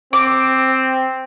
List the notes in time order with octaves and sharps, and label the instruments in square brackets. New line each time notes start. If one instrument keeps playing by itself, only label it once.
[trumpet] C4 [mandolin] D6